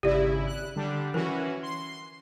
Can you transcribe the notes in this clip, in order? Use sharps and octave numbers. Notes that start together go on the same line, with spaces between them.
G#1 C#3 E4 G4 D5
F#6
D3 G3 D4
E3 C#4 F#4 A#4
C6